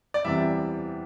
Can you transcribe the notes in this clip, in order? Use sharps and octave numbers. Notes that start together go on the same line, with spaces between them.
D5
E2 C3 E3 G3 E5